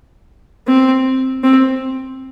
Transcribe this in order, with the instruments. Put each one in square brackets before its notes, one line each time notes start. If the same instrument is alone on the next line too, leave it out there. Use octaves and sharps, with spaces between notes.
[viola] C4
C4